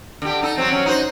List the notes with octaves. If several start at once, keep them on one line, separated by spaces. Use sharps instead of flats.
D3 G4
D#4 A4
F#3 C4
F#3 C#4
D#4 F#4 C5